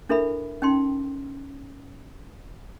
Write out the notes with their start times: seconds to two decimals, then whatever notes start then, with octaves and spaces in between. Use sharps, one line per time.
0.09 D4 E4 A4 A#4 E5 B5
0.62 C#4 D#4 G5 C6